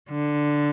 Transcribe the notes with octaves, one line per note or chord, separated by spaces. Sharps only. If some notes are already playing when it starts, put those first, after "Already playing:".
D3